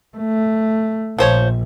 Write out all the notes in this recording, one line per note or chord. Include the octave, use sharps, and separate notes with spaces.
A3
A#1 F3 C5 C#5